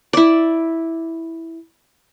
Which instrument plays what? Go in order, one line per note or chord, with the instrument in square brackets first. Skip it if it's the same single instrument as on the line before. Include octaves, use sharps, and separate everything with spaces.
[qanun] E4 D5